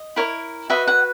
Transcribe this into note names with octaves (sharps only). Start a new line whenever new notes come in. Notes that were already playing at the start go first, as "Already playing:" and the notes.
Already playing: D#5
E4 A#4 C#5
F#4 B4 D#5 E5
F#5